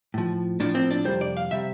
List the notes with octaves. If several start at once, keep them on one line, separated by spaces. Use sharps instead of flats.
A2 F3
A2 F3 D4
C4
D4
F2 C3 G3 C5
D5
F5
C3 G3 E5